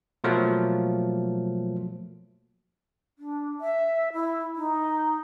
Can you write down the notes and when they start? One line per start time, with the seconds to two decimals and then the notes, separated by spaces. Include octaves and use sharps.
0.24 B2 F3 F#3 A3 A#3
3.19 D4
3.61 E5
4.13 E4
4.56 D#4